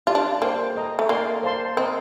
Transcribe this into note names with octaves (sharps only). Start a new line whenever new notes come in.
F4 G4 D5 A5
D4
A#3 C5 G5 C6
A4 D#5 A#5
A3
A#3 A#4 D5 G5 C6
C5 F5 A5 C6
C4 A#4 D#5 A#5